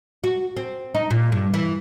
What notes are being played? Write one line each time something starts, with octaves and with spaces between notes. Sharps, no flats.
F#4
C4
D#4
A#2
G2
E3